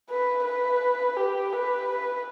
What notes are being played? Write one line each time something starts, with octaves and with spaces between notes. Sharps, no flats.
B4
B4
G4
B4
B4